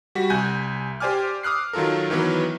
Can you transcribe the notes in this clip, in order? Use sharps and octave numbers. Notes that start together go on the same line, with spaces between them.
G3 F#4 B6
C2 G#5 F#6 G6
G4 C5 D5 G#5 D6 F6
D6 D#6 F6 F#6 C7
D#3 F#3 F4 A4 A#4
D#3 E3 F#3 B3 B4